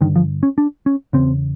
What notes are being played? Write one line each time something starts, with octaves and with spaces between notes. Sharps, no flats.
G2 D3 D#3
F3
C#4
D4
C#4
E2 C#3 C4